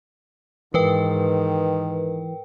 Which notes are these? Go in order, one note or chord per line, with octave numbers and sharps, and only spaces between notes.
G#2 D#3 E3 A#4 B4 G5